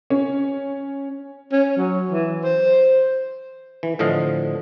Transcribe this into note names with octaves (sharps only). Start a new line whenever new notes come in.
C#4
C#4
F#3
E3
C5
E3
A2 D3 F3 D#5 F5